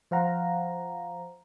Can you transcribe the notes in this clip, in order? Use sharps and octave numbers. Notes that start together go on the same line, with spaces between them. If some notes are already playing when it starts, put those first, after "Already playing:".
F3 C5 F5 F#5 A#5